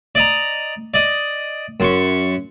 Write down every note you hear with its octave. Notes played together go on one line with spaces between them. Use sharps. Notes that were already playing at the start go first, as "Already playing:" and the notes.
D5 D#5 A#5
D5 D#5
F#2 C6 C#6